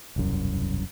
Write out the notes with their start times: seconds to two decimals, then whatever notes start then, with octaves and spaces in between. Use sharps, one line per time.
0.16 E1 C2 F#2